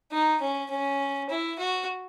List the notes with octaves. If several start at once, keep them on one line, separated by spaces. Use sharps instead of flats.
D#4
C#4
C#4
E4
F#4